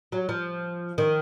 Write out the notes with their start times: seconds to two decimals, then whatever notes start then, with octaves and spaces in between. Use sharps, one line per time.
0.12 F#3
0.29 F3
0.98 D#3